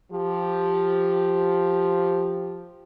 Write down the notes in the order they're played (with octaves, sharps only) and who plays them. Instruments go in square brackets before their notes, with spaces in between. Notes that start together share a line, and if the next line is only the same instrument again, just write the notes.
[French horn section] F3 G4